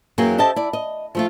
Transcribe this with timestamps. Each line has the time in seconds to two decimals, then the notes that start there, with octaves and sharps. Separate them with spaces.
0.18 F#2 E3 F#3 A#3 G#4 G5
0.38 G4 A4 C5 D#5 E5 A5
0.56 E4 D5
0.73 D#5
1.15 F3 A3 F4